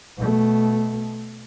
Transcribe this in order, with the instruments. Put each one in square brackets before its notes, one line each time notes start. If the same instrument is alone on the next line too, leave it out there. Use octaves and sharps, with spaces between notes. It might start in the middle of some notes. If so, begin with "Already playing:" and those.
[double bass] B2 A3